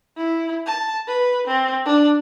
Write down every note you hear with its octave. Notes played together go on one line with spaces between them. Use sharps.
E4
A5
B4
C4
D4